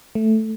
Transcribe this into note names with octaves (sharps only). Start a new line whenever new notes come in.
A3